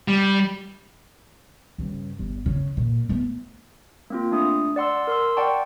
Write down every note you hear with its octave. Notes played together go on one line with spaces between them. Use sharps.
G3
G2 C#3
G1
C#3
A#2
A3 B3
A#3 C4 F4
A3 D4 D#6
D5 F#5 C6 E6
A#4 C6 E6
D5 F#5 G5 A5 C#6